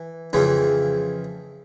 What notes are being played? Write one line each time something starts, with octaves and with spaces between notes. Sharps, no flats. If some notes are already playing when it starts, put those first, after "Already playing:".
Already playing: E3
F2 C#3 E3